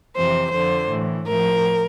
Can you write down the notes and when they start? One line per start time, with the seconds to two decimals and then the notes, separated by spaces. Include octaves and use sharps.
0.15 F2 C3 E3 C5
0.53 F2 D3 F3 C5
0.90 A2 E3
1.27 A2 F3 A#4